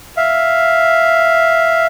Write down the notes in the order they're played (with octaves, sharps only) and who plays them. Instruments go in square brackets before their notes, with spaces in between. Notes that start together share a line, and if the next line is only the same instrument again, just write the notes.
[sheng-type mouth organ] E5 F5